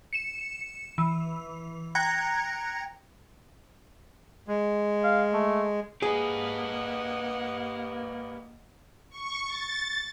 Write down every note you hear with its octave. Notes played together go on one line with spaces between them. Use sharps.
C#7 E7
E3
G5 A#5 F#6 G#6 A#6 C#7
G#3
F5
A3
A#3 G4 G#4 B4 D#5 F#5
C#6
A6